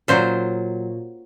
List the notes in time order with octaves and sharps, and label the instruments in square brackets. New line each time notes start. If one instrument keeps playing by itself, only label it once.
[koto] A#2 F#3 C5